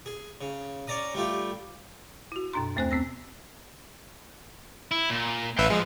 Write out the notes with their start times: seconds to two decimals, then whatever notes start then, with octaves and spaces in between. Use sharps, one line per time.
0.06 G#4
0.41 C#3
0.87 C#4 D5 A#5 D#6
1.15 G3 A3 F4 G4
2.32 E4 F#4
2.53 F#2 B2 D4 A#5 C6
2.76 D#2 A3 C4 C5 G#5 F#6
2.91 B3 C4 E6 A#6
4.91 E4
5.10 A#2
5.58 A1 B4 E5 F5 G5
5.70 F3 G#3